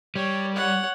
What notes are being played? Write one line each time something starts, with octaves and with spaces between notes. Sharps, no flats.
G3 C#5
C#5 F#5